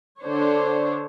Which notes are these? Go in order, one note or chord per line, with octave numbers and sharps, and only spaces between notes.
D3 D4 C5 C#5